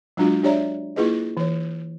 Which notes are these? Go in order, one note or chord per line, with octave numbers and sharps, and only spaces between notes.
F#3 G#3 D4 F4 F#4
D4 G4 C#5 D5 E5 A#5
A#3 E4 F4 G#4 B4 D#5
E3 C#5